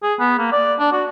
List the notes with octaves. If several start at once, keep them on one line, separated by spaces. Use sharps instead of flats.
G#4
B3
A#3
D5
D4
F#4